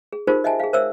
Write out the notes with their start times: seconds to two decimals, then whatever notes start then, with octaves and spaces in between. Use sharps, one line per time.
0.13 G#4
0.27 D#4 F4 G4 G#4 A#4 C5
0.44 D#5 E5 F#5 G#5 A5
0.60 G#4 F5
0.73 A#4 C5 C#5 E5 F#5 E6